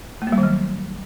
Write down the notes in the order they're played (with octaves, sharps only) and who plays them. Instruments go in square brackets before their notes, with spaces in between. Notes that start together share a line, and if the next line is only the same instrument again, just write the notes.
[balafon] A3
A#3
G3
D#3
F#3